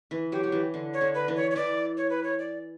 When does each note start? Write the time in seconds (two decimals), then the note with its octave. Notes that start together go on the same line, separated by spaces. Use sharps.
0.11 E3
0.32 F#3 G4
0.43 F#3
0.52 E3
0.74 D3
0.94 C#5
1.01 D3
1.14 B4
1.28 E3
1.36 C#5
1.51 C#5
1.56 E3 D5
1.97 C#5
2.10 B4
2.23 C#5
2.39 D5